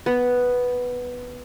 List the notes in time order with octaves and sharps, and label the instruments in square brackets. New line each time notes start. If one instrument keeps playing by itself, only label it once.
[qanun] B3